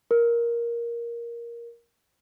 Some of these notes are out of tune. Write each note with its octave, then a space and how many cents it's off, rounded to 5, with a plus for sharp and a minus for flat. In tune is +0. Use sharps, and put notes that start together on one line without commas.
A#4 +10